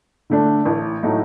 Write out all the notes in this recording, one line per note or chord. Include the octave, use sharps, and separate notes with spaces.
D3 A3 D4
A1
A2 F#3 A3 D#4